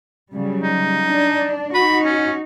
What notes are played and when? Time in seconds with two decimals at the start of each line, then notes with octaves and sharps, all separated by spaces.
0.33 C#3 F#3 G3
0.63 D#4
1.05 D4
1.75 D#4 F#4 B5
2.05 C#4